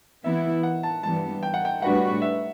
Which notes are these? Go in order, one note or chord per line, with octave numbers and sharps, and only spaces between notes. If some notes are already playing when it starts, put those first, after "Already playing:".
E3 B3 E4 E5
F#5
A5
G2 E3 G3 B3 A5
G5
F#5
G5
A2 G3 D4 F#4 B4 F#5
E5